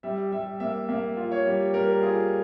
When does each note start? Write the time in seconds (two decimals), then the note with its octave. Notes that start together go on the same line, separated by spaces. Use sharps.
0.03 G3 E5
0.32 G3 E5
0.60 A#3 E5
0.89 A#3 E5
1.17 F4
1.31 C#5
1.46 G3
1.74 G3 A#4
2.03 F4 G#4